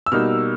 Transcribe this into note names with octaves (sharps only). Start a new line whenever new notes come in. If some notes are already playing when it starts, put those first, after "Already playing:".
E6
B2 G3 A#3 D#4 F6